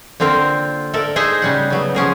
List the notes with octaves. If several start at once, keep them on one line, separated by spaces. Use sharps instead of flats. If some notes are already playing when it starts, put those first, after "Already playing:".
D3 A#3 C4 F4 A#4
A4 A#4 D5 E5
D#4 G#4 C5 D#5 E5
C#3 G3 F#5
C#3 F#3 B3
F3 C#4 G#4 A#4